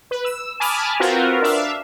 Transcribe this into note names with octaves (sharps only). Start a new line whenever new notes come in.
B4
E6
G#5 A5 B5 D6 D#6 F6
C4 F4 F#4 A#4 B4
D4 E5 F5